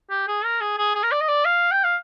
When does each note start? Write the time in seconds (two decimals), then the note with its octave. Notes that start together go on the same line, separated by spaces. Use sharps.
0.10 G4
0.28 G#4
0.44 A#4
0.61 G#4
0.78 G#4
0.95 G#4
1.03 A#4
1.12 D5
1.21 D#5
1.28 D5
1.45 F5
1.72 G5
1.84 F5